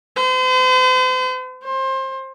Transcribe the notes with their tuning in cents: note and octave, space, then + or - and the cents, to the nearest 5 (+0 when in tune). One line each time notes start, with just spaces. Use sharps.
C5 -40
C5 +25